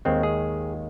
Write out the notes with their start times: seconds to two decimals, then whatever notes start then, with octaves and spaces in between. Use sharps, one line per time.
0.05 D#2 D#3 G#3 C4
0.23 G#4